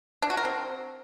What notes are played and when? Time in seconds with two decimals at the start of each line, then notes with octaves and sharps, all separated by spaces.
0.22 D4
0.30 F#4
0.37 A#4
0.45 C4